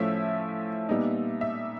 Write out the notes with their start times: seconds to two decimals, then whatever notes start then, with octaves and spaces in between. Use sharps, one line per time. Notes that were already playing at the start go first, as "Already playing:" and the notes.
Already playing: A2 F3 A3 C#4 E5
0.89 A#2 G3 B3 D#4
1.41 E5